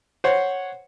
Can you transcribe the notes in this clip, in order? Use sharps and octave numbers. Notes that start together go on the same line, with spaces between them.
C5 C#5 F#5